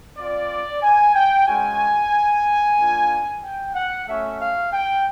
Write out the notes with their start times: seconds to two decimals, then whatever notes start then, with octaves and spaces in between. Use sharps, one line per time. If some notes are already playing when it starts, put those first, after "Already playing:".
0.18 C4 F4 D5
0.83 G#5
1.15 G5
1.47 G#3 C#4 F#4 G#5
2.78 A#3 D4 F4
3.44 G5
3.75 F#5
4.08 A3 C#4 F#4 E5
4.41 F5
4.73 G5